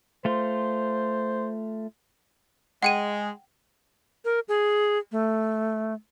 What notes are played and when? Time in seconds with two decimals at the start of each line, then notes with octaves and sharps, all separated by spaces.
0.25 A3 F4 C5
2.82 G#3 F#5 G5 D#7
4.25 A#4
4.48 G#4
5.12 A3